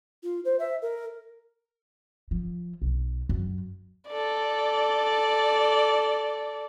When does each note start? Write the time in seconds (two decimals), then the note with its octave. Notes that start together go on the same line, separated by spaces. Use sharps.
0.23 F4
0.45 C5
0.59 E5
0.82 A#4
2.31 F3
2.82 B1
3.29 F#2
4.09 A4 D5